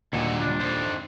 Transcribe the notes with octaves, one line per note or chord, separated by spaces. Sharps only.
D#2 A#2 D3 F#3 G3 F#5
G3 D4 F4
F2 D#3 C5